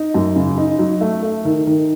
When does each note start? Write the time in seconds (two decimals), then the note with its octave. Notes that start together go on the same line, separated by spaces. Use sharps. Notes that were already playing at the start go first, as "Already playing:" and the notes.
Already playing: D#4
0.14 F#2
0.36 C#3
0.58 D#4
0.79 F#3
1.01 A3
1.22 A3
1.45 D#3
1.67 D#3